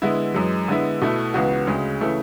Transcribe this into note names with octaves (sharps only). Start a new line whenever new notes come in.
D3 G#3 B3 E4
F#2 E3 G#3
D3 G#3 B3 E4
B2 A3 E4
C#2 C#3 E3 B3 F#4
D2 C#3 G#3
C#3 E3 A3 E4